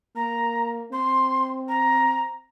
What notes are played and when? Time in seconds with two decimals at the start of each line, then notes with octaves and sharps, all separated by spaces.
0.16 A#3 A#5
0.92 C4 C6
1.68 A#5